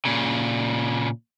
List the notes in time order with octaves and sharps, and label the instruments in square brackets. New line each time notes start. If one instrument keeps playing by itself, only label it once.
[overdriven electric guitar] A#2 C#3